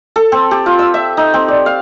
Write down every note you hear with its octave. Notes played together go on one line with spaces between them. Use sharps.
A4
C4
G4
F4
E6
E5
D#4
C4
D5
F5